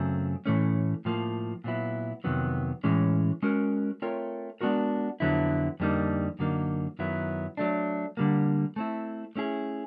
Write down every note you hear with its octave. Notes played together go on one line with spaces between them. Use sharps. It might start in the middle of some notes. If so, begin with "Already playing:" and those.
Already playing: F#2 C#3 F#3 A3 C4
A2 E3 A3 C#4
A2 F3 A#3
A#2 F#3 B3 E4
F2 C3 D#3 F#3 B3
A2 E3 G#3 C#4
G#3 C#4 F#4 A#4
A3 C4 F4 A#4 C#5
G#3 B3 D4 F#4 A#4
F2 D3 F#3 B3 E4
F2 D3 G3 A#3 D#4
F#2 D3 F#3 A#3 D#4
F#2 D#3 F#3 B3 E4
F#3 A3 D4
D3 G3 A#3
A3 C4 E4
A3 C#4 E4 G#4